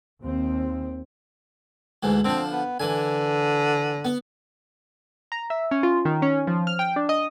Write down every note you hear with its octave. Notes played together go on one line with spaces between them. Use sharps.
D#2 C4
D2 G#2 E3
D3 F3 C4
B3
D3 E3 G#5
B3
A#5
E5
C#4
F4
D#3
C#4
F3
F6
G5
D4
D#5